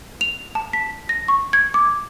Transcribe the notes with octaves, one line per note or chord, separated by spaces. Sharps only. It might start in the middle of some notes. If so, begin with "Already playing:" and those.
F7
A5
B6
A#6
C#6
G#6
D6